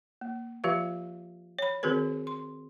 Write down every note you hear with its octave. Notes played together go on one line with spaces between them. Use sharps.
A#3
F3 F4 G4 B4 E5 F5
C#5 B5
D#3 C4 F#4 G#4 A#4 B4
C6